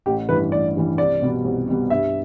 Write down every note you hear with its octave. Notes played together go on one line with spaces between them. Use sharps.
A1 G4
G2 E3 G3 B4
A1 D5
G2 E3 G3
C2 D5
B2 G3 B3
C2
B2 G3 B3
G2 E5